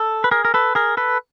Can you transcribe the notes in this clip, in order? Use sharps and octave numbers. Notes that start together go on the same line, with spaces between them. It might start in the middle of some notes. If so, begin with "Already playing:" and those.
Already playing: A4
B4
G#4 A#4
A#4
A4 B4
G#4 A#4
A4 B4